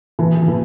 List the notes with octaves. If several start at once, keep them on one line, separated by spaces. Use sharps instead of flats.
E3
E3